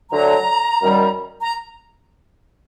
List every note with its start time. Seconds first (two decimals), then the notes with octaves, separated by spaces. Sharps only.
0.11 D2 D3 F#3 A#5
0.82 F#2 D#3 G3
1.41 A#5